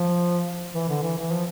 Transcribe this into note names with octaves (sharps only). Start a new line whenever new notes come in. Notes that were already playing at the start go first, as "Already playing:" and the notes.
Already playing: F3
E3
D3
E3
E3
F3